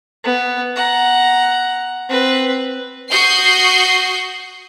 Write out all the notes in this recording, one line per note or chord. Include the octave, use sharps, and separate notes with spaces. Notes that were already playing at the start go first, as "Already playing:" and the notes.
B3
F#5 A#5
C4 B4
F#4 C#6 D#6 G6 C7